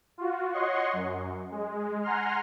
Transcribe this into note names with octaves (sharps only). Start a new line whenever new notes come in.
F4 F#4
C#5 D#5 F#5 C6 C#6
F#2
G#3
F#5 G#5 A#5 C6 F6